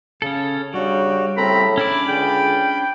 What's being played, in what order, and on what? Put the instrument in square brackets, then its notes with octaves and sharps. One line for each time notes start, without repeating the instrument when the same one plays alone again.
[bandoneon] C#3 [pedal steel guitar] C#4 A4
[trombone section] C#3 D4 [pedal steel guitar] G3 [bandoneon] F#4
[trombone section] A2 C#3 A4 [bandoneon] C4 A#5 [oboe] B5
[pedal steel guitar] C#4 D4 D5 [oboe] E4 [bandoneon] B5
[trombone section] C#2 D3 G#4 [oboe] G5